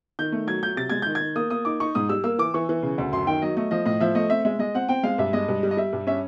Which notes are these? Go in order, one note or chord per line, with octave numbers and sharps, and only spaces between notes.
D#3 G6
A3
F#3 G#6
F#3 G6
C3 A6
G#3 G#6
D#3 G6
G#6
D#3
A#3 D#6
A#3 D#6
D#4 D6
D#4 C#6
G#2 D#6
G3 E6
A#3 E6
E3 D6
E3 C#6
E3
C#3
D2
F#2 C6
D#3 G5
F#3 D#5
A3 D#5
F3 D#5
A2 D#5
F3 E5
A3 D#5
C4 E5
G#3 E5
G#3 D#5
C4 F#5
C4 G5
G#3 F5
G2 E5
G#3 D#5
G2
G3
D#5
G3 E5
G2
C#4 E5